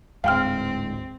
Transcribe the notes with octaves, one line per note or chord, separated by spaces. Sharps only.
D1 G#2 C4 F5 G5 F6